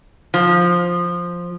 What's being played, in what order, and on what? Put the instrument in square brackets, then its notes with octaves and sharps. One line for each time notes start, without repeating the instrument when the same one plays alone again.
[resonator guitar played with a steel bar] F3